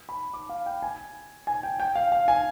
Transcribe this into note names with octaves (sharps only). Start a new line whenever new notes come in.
B5
D6
F5
G5
G#5
G#5
G5
G5
F5
F5
G#5